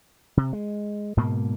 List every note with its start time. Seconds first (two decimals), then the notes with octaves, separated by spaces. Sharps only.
0.37 C3
0.53 G#3
1.17 G#2 B2 A#3